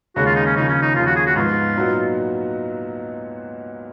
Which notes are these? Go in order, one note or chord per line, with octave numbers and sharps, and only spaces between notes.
D#2 C#3 G#3 C#4 F#4 G#4
F4
D#4
C#4
D#2 C#3 F3 D#4
C#4
D#4
D#2 C#3 F3 F4
F#4
G#4
F#4
G#2 F3 B3 F4
A#2 F#3 B3 D#4 F#4